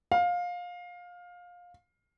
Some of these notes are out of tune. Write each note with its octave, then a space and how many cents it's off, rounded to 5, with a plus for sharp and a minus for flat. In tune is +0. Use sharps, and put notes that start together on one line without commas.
F5 +20